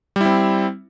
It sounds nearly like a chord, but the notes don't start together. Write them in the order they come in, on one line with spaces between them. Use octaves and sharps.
G3 E4 C4